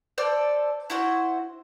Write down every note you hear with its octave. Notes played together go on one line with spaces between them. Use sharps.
A4 C5 D5
E4 F#4 C5